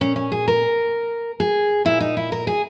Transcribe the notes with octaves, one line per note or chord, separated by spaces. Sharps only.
A#2 C#4
C#4
G#4
A#4
G#4
A#2 E4
D#4
E4
A#4
G#4